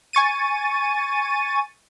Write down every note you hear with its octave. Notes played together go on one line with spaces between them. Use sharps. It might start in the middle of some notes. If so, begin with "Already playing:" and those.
G#5 C#6 A6 D#7